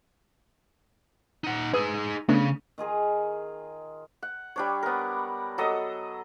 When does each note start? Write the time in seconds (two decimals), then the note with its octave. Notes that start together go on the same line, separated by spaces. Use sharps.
1.44 D#4 F#5
1.74 D#4 G#4 B4 D#6 E6
2.29 C#3 A3 B3 D4
2.78 D#3 F4 G#4 A#4
4.22 F#5
4.56 G3 D4 C#5
4.83 B3 A#4
5.58 F#3 A4 D#5 D#6